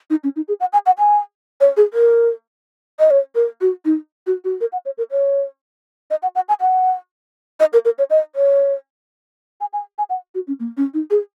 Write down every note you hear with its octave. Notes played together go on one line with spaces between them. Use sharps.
D#4
C#4
D#4
G#4
F#5
G#5
F#5
G#5
C#5
G#4
A#4
D#5
C#5
A#4
F#4
D#4
F#4
F#4
A#4
F#5
C#5
A#4
C#5
D#5
F#5
F#5
G#5
F#5
D#5
A#4
A#4
C#5
D#5
C#5
G#5
G#5
G#5
F#5
F#4
C#4
A#3
C#4
D#4
G#4